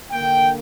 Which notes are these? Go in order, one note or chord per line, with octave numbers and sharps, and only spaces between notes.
D3 A#3 G5